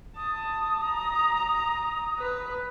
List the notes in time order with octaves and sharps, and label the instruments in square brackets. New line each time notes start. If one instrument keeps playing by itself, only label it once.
[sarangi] A5 [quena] D#6
[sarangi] A#5
B4